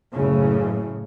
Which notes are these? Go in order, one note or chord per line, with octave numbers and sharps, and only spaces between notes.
F#1 A2 C#3